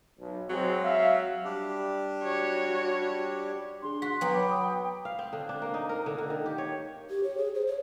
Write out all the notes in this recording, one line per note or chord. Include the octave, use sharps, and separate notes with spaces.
B1
F#3 G#3 C4
E5 F5
G3 D4 G4
F#4 C#5
D4 G#4 C6
F#4 B6
F#3 B3 G5
C#5 B5 D6
B5 D#6
F5
C4
D3
D4
A#3
D#4
A#4
D3
D3
D#3
G4
C#5
G4
C#5
G#4
C5
C#5